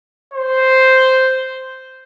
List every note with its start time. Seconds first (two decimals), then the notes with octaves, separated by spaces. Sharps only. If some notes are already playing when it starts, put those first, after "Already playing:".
0.34 C5